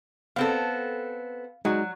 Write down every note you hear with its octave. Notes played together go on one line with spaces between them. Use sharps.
B3 C4 A4 F5
F#3 G#3 D#4 F#4